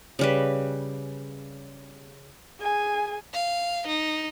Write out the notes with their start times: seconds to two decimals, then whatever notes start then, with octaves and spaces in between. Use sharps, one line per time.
0.19 C#3 G3 B4
2.60 G#4 G#5
3.34 F5
3.87 D#4